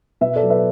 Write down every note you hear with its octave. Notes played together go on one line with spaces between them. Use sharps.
B2 B4 E5
A4 D5
F#3
B4 E5